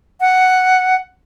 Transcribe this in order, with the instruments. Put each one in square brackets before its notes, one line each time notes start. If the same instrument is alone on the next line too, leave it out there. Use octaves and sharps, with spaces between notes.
[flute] F#5